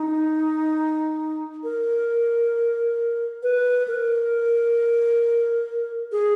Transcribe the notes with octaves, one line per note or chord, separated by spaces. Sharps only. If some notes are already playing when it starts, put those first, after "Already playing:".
Already playing: D#4
A#4
B4
A#4
G#4